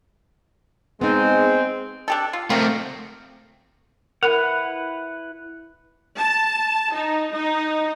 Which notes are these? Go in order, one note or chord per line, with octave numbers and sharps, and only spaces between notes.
G#3 B3 C4 D#4
D4 G4 A4
F4
A3 C4 F4 G4 A#4
E4 A#4 B4 F#5
A5
D#4
D#4